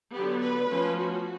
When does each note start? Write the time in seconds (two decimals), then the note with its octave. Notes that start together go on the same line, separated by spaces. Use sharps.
0.12 D3 F#3 B3 G4
0.40 B4
0.69 F3 A3 C#4
0.98 F#4